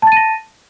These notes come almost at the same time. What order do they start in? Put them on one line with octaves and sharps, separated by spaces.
A5 A6 D#7 A#6